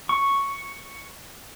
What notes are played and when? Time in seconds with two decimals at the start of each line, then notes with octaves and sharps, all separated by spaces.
0.09 C#6